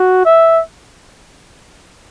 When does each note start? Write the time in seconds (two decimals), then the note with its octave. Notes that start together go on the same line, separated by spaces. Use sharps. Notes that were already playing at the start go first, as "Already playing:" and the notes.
Already playing: F#4
0.25 E5